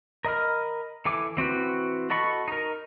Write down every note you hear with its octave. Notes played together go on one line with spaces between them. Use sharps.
A#4 D#5 B5 F6
E3 A4 G#5 D6
E3 C4 F#4 B4
F#4 A4 D#5 B5 C#6
D#4 A#4